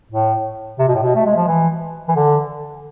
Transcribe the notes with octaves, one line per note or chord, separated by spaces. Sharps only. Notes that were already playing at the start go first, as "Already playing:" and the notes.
A2
C3
B2
A2
B2
A3
G#3
F3
E3
E3
D3